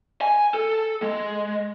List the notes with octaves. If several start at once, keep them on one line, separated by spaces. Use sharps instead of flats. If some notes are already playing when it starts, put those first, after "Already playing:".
G#5
A4
G#3